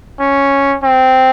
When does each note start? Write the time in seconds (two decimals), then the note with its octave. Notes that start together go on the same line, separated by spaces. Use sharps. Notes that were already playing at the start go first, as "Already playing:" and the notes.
0.20 C#4
0.83 C4